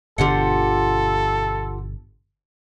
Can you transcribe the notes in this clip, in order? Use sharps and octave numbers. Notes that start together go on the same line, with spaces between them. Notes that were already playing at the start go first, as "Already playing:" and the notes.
G1 B2 D3 F4 G4 A4 F#5